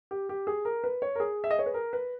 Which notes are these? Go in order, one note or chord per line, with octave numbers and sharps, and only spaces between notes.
G4
G4
G#4
A#4
B4
C#5
A#4
G#4
E5
D#5
C#5
B4
A#4
B4